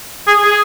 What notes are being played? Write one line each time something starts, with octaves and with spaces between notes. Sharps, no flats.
G#4
G#4